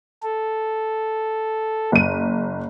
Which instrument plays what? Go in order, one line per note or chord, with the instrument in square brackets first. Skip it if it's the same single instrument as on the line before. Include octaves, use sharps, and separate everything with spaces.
[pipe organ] A4
[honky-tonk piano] F#1 D#7